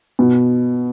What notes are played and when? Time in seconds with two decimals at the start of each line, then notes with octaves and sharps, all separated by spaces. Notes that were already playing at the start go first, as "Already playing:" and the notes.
0.19 B2